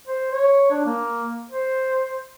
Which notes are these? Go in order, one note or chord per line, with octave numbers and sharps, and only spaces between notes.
C5
C#5
D4
A#3
C5